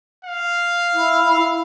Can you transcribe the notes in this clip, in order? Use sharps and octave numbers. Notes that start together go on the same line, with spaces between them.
F5
E4